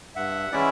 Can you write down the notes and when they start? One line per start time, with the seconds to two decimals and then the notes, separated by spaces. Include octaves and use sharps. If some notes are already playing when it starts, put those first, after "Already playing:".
0.15 G2 E5 F#5
0.52 E3 G#3 C#4 E4 D5 E5